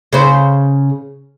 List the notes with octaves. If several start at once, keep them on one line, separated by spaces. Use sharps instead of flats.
C#3 C5